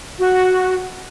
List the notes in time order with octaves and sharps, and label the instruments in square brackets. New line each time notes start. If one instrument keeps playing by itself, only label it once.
[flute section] F#4